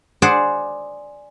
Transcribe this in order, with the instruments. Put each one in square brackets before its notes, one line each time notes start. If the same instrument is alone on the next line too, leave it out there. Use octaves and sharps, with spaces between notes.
[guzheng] G#4 C5 D5 F#5